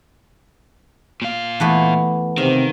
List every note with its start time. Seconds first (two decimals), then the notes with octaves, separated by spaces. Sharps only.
1.22 A#2 F5
1.60 E3 A3 B3
2.38 C3 D#3 F5